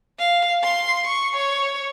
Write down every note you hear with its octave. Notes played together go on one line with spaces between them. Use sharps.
F5
C6
C#6
C#5